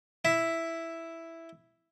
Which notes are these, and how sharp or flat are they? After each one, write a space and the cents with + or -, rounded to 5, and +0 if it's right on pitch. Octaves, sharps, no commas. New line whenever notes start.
E4 +0 E5 +0